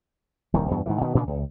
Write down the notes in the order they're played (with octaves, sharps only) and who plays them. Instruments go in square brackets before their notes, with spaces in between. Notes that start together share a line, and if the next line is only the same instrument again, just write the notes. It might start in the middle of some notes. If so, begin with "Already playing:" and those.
[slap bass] D#1 C2 D#3
E2 G2 B2
G#2 D#3 E3
B2 D#3 B3
A#2 C#3 D4
C#2